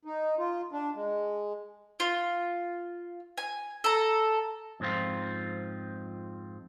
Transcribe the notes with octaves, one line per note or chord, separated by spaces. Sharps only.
D#4
F4
D4
G#3
F4
G#5
A4 A#5
F2 G#2 F3 C4 F4